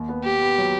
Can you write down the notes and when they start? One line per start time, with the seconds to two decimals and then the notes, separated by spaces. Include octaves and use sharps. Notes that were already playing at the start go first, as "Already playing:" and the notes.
Already playing: D#2
0.09 B3
0.24 B3 G4
0.42 B3
0.58 F#3